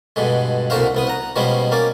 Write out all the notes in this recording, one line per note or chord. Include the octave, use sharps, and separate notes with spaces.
G2 B2 D3 G#3
C2 A#2 D3 F#4 C5 F5
C2 B3 D#6
F#5 A#5
B2 F3 G3 G#3 B3 C#4
A#3 C#4 D5